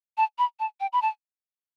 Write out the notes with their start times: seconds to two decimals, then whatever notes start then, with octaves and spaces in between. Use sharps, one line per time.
0.17 A5
0.38 B5
0.59 A5
0.80 G5
0.93 B5
1.02 A5